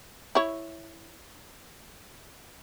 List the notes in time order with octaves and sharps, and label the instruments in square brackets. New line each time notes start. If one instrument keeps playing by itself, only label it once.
[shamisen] E4 C#5